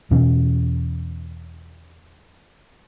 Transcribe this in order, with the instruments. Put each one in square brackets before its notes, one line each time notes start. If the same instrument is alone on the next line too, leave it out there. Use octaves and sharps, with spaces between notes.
[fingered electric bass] E2 B2 E3 C#4